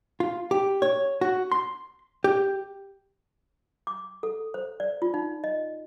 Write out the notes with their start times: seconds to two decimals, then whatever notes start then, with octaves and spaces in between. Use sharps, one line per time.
0.20 F4
0.51 G4
0.82 C#5
1.21 F#4
1.52 C6
2.24 G4
3.87 D6
4.23 A4
4.54 C5
4.80 D5
5.02 F4
5.14 D#4
5.44 D#5